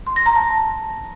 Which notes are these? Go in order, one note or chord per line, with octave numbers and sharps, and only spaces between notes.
C6
A#6
A#5
A5